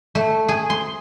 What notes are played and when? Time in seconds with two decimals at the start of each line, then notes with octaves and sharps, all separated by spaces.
0.15 A3
0.48 G#4
0.70 C6